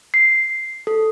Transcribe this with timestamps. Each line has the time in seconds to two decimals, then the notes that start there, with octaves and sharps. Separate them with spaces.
0.14 C7
0.87 A4